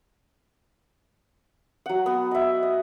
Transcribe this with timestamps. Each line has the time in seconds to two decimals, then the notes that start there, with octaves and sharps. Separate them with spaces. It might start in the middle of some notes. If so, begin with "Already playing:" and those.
1.86 F#3 F#5
2.06 B3
2.31 D#5 E5
2.63 D#5